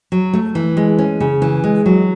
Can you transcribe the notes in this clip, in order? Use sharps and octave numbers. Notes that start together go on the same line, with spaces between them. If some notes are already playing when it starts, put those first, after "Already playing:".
F#3
A3
E3
G#3
C#4
C#3
E3
G#3
F#3